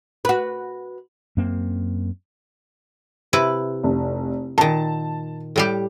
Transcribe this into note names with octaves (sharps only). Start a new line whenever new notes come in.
F#4 B4
F#2 A#3 C4
C3 E4 B4
F1
A#2 D#3 A5
A2 G3 G4